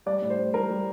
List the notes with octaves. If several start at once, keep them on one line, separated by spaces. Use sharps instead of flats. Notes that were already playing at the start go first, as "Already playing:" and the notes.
G3 D5
A2
C5
A2
G3 A#4
G3